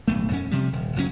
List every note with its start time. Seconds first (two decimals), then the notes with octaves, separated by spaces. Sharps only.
0.08 D1 B1 A3
0.31 F2 C#4
0.51 C3 F3 G3
0.73 D#1
0.96 F#1 A#2 F#3 C#4